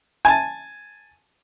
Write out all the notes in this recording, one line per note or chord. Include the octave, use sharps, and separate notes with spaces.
G#5 A5